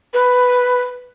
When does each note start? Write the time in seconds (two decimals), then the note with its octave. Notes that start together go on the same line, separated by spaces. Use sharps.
0.13 B4